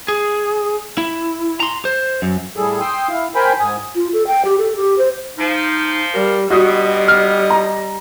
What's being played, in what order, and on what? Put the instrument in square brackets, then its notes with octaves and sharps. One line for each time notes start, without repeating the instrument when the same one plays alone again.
[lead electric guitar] G#4
E4
A#5 C6
C5
F#2
[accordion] A2 G3 G#4 A4
G5 C6 D#6 E6
E4 F5
A#4 C5 G5 G#5 B5
G#2 G#5 D#6
[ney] F4
A4
G5
G4
A4
G4
C5
[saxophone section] F3 [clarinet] D#4
[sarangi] G3 [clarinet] A#4
[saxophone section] D2 B2 [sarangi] G3 [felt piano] F#4 D#6 [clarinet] D#5
[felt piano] F6
A#5